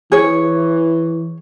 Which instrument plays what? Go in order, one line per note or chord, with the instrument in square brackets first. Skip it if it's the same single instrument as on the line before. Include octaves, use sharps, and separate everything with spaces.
[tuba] E3 [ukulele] G#4 C#5